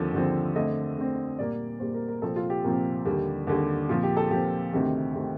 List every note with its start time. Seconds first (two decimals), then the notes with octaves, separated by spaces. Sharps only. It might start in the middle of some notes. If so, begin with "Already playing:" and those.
Already playing: D#2 D3 F3 C4 A4
0.13 D#2 D3 F3 C4
0.55 F2 D3 A3 C4 D#5
0.97 F2 D3 A3 C4
1.38 A#2 G3 A#3 D5
1.80 A#2 G3 A#3 C5
1.94 A#4
2.08 A#4
2.22 C2 A#2 F3 C4 A4
2.36 F4
2.50 G4
2.64 C2 A#2 F3 C4 A#4
3.05 D#2 D3 G3
3.47 D#2 D3 G3
3.89 A#2 F3 C4 F4
4.03 G4
4.17 A4
4.31 A#2 F3 C4 G4
4.73 D2 C3 D#3 A3 C4 G4
5.15 C3 D#3 A3 C4